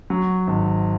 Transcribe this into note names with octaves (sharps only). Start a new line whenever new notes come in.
F#3
G#1